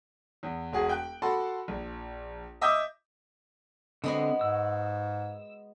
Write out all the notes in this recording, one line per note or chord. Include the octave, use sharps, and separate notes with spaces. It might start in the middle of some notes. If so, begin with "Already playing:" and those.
E2
E1 F#4 G#4
G5 F#6
F#4 A4 F#5 A5 B5 C6
A#1
D#5 E5 D6 D#6 G6
D3 G#3 B3 C4 F#4
G#2 E6